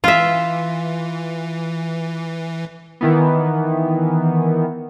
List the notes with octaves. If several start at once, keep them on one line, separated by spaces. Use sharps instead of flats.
E3 F4 E5
D#3 E3 B3